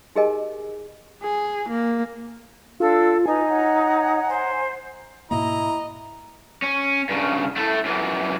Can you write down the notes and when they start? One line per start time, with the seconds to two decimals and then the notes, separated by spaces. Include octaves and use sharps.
0.16 D#4 G4 G#4 A#4 D#5 G#5
1.22 G#4
1.69 A#3
2.80 D4 F4 A4 F5 E6
3.26 D#4 B4 G#5
3.47 C#5 F#5 A#5
4.29 C5
5.31 G#2 B2 A#3 E4 D#5 A#5
6.62 C#4
7.09 G2 C#3
7.56 A3 E4
7.85 F#2 E3